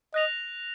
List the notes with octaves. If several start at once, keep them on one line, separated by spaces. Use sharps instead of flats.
D#5 F#6 A#6 F7